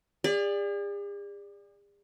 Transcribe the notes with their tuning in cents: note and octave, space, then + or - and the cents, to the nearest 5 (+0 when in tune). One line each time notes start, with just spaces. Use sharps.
G#4 -45 D5 +0